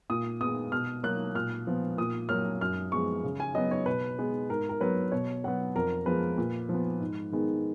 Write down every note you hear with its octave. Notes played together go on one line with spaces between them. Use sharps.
A#2 D#6
G#3 B3 D#6
B2 F6
F#3 A#3 F#6
A#2 F6
F3 B3
A#2 D#6
F#3 A#3 F6
F#2 F6
F3 G#3 B3 C#6
C#3
G#5
F#3 B3 D#5
C#5
B2 B4
G#3 B3
G#2 A#4
A#4
F#3 B3 B4
B2 C#5
F#3 B3 F#5
F2 A#4
F3 G#3 B3 B4
A#2
F3
B3
G#2
D#3 G#3 B3